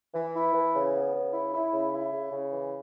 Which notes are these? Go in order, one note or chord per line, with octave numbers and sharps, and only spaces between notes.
E3
E4
E3
C#3
B3
C#3
E4
E4
C#3
E4
C#3
C#3
E3